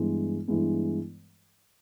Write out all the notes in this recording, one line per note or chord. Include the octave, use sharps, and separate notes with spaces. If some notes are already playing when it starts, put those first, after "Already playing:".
Already playing: G2 E3 G#3 B3
G2 E3 G#3 B3